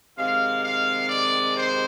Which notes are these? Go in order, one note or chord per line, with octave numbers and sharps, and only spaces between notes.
C3 D#3 G#3 F5
F5
D5
C5